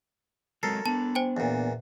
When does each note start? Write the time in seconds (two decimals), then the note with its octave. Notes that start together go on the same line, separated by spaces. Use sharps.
0.63 F#3 G#3 C4 A4 A#4 C7
0.86 B3 D4 A5
1.15 C5 G5 G#5
1.37 E2 A#2